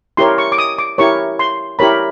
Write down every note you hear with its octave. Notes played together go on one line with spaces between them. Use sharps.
E4 G4 A#4 C#5 C6
C#6
D6
D#6
D6
E4 G4 A#4 C#5 C#6
C6
E4 G4 A#4 C#5 B5